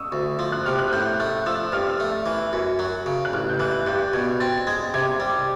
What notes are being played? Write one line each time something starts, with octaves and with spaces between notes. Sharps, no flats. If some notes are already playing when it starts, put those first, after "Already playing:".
Already playing: C#6 D#6 E6
D2
F3
F#6
C3 F6
F#6
A2 G6
A3 F#6
F3 E6
G2 F6
A3
E3
F#2
F#3
C#3
F#6
A1 F6
G6
E3 F#6
G2 G6
B2 G#6
C4 A6
G#3 G#6
C3 G#6
G3